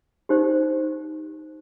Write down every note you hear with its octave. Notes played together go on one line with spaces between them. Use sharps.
D#4 G4 C5